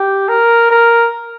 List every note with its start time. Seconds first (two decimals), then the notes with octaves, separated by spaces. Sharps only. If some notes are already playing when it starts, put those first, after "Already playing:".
Already playing: G4
0.28 A#4
0.70 A#4